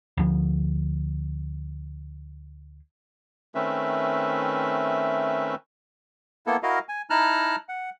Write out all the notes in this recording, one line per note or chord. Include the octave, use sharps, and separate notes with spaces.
D2 F3
D#3 A3 C4 C#4 B4 E5
A#3 B3 E4 A4
E4 F#4 A#4 D#5 F5
G#5
D#4 E4 A5 A#5 F6 F#6
F#5